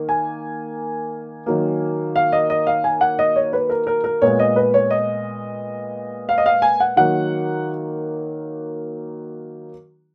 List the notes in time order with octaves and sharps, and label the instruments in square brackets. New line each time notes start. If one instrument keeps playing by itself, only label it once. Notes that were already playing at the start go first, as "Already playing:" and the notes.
Already playing: [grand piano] D#3 A#3
G#5
D#3 F#3 A#3
F5
D#5
D#5
F5
G#5
F#5
D#5
C#5
B4
A#4
A#4
A#4
A#2 G#3 B3 C#5
D#5
B4
C#5
D#5
F5
D#5
F5
G#5
F#5
D#3 F#3 A#3 F#5